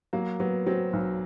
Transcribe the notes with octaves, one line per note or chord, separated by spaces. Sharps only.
F#3 A#3
F#3 B3
F#3 C4
B1